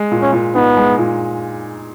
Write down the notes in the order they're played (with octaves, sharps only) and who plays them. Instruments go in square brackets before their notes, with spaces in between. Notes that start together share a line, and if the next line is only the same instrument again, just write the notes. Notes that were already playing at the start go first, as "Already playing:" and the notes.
Already playing: [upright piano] G#3
A#2
[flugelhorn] C#4
[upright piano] A#2
[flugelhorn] B3 [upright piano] D#4
[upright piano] G#3
A#2